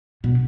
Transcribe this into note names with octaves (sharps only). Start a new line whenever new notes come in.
B2